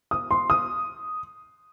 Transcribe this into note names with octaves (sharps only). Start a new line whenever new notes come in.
D#6
C6
D#6